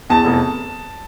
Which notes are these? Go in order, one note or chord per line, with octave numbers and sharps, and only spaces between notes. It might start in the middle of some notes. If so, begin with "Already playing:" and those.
E2 A5
F1